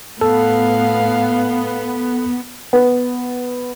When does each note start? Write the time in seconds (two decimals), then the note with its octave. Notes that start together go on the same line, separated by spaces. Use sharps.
0.21 A2 B3 A4 F5
2.73 B3